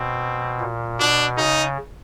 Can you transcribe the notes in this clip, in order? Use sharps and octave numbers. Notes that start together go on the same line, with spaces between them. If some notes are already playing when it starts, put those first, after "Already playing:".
Already playing: B2 C4
A#2
B2 D4
C#3 D#4